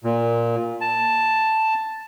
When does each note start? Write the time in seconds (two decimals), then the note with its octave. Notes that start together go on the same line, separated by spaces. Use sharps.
0.04 A#2
0.81 A5